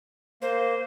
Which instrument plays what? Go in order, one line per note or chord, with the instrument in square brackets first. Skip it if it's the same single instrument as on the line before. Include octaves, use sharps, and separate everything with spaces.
[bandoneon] A#3 [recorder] C5